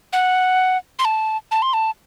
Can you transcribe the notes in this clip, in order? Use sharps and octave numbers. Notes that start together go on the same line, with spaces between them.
F#5
C6
A5
A5
C6
A5